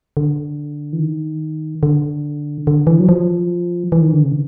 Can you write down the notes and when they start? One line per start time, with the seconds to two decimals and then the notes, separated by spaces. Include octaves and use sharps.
0.17 D3
0.93 E3
1.00 D#3
1.83 D3
2.67 D3
2.87 E3
3.00 F#3
3.09 F3
3.92 E3
4.02 D#3
4.13 D3
4.23 C#3